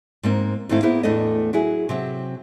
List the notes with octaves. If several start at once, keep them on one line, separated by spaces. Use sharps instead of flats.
G#2 A#3 C4
G#2 D#3 A3 C4 E4 F5
A#3 B3 E4 G#4 C5
E2 A2 A3 D4 A4 D#5
F#3 E4 F#4 G#4
C3 F#3 C4